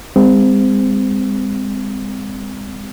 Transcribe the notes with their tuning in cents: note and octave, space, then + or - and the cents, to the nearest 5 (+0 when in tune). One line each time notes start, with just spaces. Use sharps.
G#3 -45 C4 -25